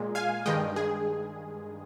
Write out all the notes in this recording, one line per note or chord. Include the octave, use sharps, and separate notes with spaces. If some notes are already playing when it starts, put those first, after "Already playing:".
Already playing: A#2 G#3
F5 G#5
G2 D#3 G#3 D#5 G5
G#4